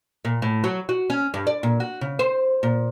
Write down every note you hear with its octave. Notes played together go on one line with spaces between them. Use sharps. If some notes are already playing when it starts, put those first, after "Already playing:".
A#2
A2
F#3
F#4
C#4
G2
D5
A#2
F#4
C#3
C5
A#2